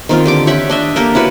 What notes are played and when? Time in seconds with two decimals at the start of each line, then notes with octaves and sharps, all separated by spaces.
0.09 D#3 C4 F4
0.26 D3 G4 D6
0.47 G4 C#5 E5 F#5
0.70 D4 D#5 E5
0.96 A#3 G4 A4 A#4
1.15 E4 F#4 B4 C#5